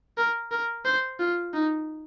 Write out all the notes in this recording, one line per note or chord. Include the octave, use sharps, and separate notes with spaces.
A#4
A#4
C5
F4
D#4